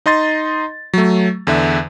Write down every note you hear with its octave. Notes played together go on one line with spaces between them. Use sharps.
D#4 D#5 C6 A6
F#3 A3
E2 D3 E5